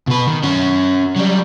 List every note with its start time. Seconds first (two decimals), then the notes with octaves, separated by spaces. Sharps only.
0.07 B2 B4
0.27 D#3
0.43 C#4 F#4
1.16 F#3 G3